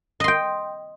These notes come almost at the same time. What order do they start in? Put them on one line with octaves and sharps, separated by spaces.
D#5 C6 G5